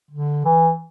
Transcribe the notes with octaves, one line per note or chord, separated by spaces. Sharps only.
D3
E3